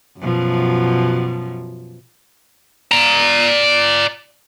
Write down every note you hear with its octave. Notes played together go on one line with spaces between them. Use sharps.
F#2 B2 F3
D5 A#5